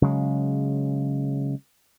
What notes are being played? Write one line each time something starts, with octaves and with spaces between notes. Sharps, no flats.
C#3 F#3 G#3